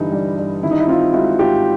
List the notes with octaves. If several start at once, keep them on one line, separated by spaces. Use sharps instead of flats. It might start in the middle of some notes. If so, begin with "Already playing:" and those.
Already playing: G2 D3 E3 D#4
G3
G2
D#3 E4
D#4
E4
C4 D#4 F4
G#3 E4 F#4
G#2 F4 G4